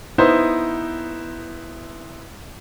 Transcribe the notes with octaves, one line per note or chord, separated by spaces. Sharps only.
B3 D#4 E4 C5